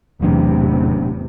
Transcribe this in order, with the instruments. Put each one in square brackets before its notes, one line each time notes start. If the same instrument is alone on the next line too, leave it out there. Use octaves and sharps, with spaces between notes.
[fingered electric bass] E1 F#3 D4 [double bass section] A1 E2 C3